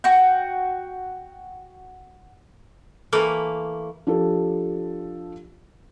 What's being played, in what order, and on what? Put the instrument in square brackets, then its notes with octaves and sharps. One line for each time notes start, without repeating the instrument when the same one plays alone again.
[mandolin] F#4 G5
[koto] E3 A3 A#3
[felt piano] F3 D4 G4 A4